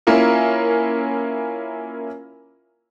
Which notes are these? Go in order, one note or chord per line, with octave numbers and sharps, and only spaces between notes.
A#3 C#4 E4 F4 A#4